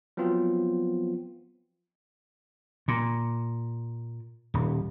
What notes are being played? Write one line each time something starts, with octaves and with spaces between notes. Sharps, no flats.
F3 F#3 B3 C4 F4
A#2
D#1